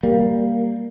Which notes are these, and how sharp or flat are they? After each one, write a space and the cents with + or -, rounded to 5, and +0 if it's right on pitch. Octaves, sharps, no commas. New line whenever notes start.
G3 +0 A#3 +0